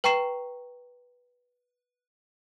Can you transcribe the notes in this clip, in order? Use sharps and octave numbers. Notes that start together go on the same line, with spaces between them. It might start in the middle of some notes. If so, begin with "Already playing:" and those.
B4 G5 A#5 C#6 C7 E7